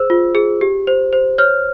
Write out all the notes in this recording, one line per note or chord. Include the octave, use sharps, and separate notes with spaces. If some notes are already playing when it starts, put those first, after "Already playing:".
Already playing: G#4 C5 E6
F4
G#4
G4
C5
C5
C#5 F6